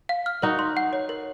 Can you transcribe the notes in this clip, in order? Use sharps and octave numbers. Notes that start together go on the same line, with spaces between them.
F5
F6
D#4 F#4 A#4
C6
F#5
C#5
A#4